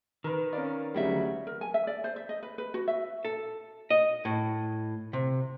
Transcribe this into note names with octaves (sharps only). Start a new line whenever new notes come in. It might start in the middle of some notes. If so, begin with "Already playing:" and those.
D#3 A#4 B4
C#4 A#4 D5 F5
D2 C#3 F#3 G3 E5
A#4
G#5
E5
D5
C5
E5
D#5
B4
B4
F#4
E5
A4
D#5
A2
C3